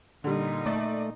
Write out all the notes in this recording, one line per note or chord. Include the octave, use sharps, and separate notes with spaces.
A#2 D3 G3 D#4
A3 D5